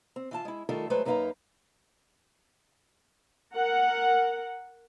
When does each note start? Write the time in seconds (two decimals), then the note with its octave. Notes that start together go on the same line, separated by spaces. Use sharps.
0.16 C4
0.31 E3 F4 A5
0.45 G#3 E4
0.69 D#3 G3 A3 F4 A4 A#4
0.90 F#3 G#3 A3 A4 B4 C5
1.05 F#2 A#3 D#4 B4 F5 A#5
3.54 A#4 F#5